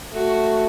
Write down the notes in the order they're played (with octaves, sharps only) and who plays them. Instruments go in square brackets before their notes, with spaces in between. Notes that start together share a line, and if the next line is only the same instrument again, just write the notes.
[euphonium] A3 [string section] F#4